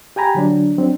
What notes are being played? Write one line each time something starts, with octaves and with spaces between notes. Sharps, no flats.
G4 G5 G#5 A#5 B5
D3 F#3 D4
F#3 C4 D4